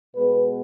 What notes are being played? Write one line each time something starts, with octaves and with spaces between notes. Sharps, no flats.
B2 G#3 B3 B4